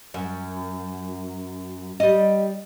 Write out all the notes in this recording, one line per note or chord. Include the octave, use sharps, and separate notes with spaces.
F#2
G3 D#5